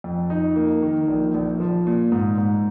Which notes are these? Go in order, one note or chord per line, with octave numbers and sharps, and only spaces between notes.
F2
D#4
A#3
D#3
A#1
A#1
F3
A#2
G#2
G#2